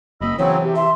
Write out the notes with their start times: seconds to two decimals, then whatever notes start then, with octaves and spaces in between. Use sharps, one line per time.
0.21 F#1 A#3 D#5 B5 E6
0.39 C#3 E3 F#3 C4 C#5
0.62 C3 G4
0.75 E5 C6